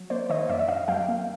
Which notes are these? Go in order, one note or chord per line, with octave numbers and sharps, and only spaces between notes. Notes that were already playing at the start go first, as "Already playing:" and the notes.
Already playing: F#3
A#3 C5 D5
D#3 C#5 D#5
F#2 D5 E5
E5
F#2 D#5 F5
F#3 F5 G5
A#3